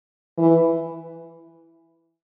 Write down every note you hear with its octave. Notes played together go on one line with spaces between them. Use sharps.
E3